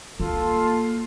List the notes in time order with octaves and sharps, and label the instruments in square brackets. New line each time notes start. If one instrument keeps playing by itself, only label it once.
[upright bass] A#3 [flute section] F4 C6 [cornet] A4